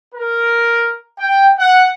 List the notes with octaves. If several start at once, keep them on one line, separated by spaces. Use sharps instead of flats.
A#4
G5
F#5